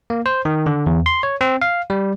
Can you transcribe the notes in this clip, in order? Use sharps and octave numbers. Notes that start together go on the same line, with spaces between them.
A#3
C5
D#3
D3
E2
C6
C#5
C4
F5
G3